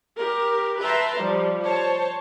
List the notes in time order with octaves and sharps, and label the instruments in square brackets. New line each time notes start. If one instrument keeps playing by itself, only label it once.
[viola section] G4 A#4
B4 E5 G5 A5 A#5 C6
F3 G3
C5 C#5 A5